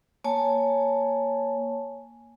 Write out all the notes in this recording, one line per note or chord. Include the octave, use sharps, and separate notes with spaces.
A#3 C#5 G#5 A5